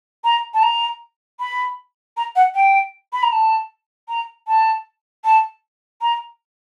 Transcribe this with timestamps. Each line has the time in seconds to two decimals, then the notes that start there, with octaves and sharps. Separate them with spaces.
0.24 A#5
0.54 A5
0.63 A#5
1.40 B5
2.17 A#5
2.36 F#5
2.55 G5
3.13 B5
3.23 A#5
3.32 A5
4.09 A#5
4.48 A5
5.25 A5
6.01 A#5